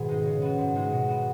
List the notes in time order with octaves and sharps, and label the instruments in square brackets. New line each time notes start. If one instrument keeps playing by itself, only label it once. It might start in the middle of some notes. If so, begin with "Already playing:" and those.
Already playing: [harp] G#2 B2 D#3 B3 F#4 G#4
G#3 D#4
C#3
B3 F#4
G#2
G#3 D#4 F#4
B2
B3 F#4